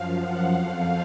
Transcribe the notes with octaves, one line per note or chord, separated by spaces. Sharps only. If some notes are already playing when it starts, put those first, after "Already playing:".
Already playing: F#2 F3 F5
F#5
F2 F3 F5